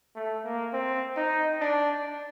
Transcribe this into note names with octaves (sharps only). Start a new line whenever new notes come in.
A3
A#3
C4
D#4
D4